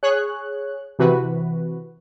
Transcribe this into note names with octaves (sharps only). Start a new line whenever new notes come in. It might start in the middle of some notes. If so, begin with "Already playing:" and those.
G#4 C#5 F#6
C3 E3 F#4 B4